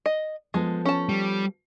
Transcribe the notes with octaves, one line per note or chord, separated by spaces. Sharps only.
D#5
F3 G#3 B3 A4
C#4 A5
G3